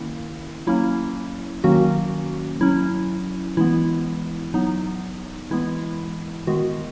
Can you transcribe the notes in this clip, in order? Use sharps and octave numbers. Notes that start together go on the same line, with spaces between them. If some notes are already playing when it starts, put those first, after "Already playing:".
Already playing: D#3 A#3 C#4 E4
F#3 A#3 C#4 E4
D#3 F#3 A#3 C#4 F#4
F#3 C#4 E4
E3 G#3 B3 E4
F#3 B3 D#4
E3 G#3 B3 E4
D#3 G#3 B3 F#4